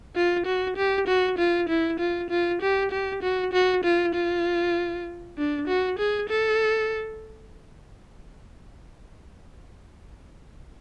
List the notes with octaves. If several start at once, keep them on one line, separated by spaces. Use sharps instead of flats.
F4
F#4
G4
F#4
F4
E4
F4
F4
G4
G4
F#4
F#4
F4
F4
D4
F#4
G#4
A4